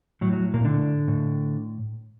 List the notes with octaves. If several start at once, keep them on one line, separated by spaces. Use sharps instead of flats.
A2 F#3
F#3
A#2 A#3
D3 D4
A2